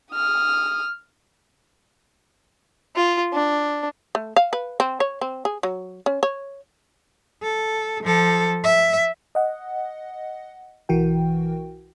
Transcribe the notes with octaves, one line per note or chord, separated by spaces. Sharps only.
D#6 F6
F4
D4
A3
F5
B4
C4
C#5
C4
G#4
F#3
C#4
C#5
A4
F3 A4
E5
D#5 F#5
B1 E3 F#4 A#4 G5